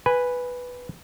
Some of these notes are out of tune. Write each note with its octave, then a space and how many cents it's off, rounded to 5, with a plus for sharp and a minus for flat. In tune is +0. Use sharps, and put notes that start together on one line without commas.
B4 +0 G#5 -5